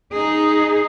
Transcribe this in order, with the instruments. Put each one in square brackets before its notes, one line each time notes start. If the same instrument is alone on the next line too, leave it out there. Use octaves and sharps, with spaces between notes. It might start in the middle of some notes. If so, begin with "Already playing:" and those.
[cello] D#4 G#4